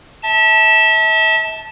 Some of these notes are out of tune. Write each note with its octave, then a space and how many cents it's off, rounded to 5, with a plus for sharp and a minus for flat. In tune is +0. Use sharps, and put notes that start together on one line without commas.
E5 -40 A5 +0